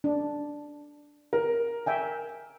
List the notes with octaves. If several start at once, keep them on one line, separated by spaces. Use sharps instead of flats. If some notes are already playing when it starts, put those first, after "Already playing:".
D4
A#4
E5 G5 G#5